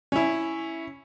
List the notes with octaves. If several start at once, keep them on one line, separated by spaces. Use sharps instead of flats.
C#4 E4